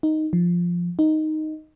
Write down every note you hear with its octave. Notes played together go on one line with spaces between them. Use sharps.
D#4
F3
D#4